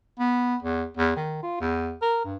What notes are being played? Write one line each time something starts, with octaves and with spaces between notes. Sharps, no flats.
B3
E2
E2
D#3
F4
E2
A#4
G2